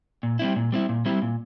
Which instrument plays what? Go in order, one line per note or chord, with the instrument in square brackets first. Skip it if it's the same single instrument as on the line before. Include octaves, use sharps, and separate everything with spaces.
[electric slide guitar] A#2
G3 C4 E4
A#2
G3 C4 E4
A#2
G3 C4 E4
A#2